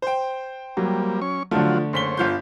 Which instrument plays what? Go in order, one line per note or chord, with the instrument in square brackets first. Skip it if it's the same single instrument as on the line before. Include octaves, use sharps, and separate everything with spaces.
[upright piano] C5 G5
[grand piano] F#3 [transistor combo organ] G3 A#3
[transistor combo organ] C#4 C#6
[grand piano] D3 A3 [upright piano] F3 [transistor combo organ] F#3 F4
[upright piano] F#1 B6 G7 [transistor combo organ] C5 C#5
[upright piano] G1 F4 G6